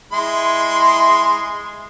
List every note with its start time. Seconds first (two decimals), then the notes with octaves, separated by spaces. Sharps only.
0.12 G#3 E4 C6